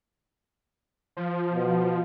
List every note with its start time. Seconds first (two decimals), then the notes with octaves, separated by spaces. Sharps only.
1.17 F3
1.52 B2